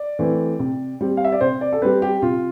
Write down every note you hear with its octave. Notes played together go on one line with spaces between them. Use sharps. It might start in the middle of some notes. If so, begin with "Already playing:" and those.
Already playing: D5
E3 A3 C4
C3
G3 C4
F5
E5
D5
C3 C5
D5
A4
G3 C4 B4
G4
C3 F4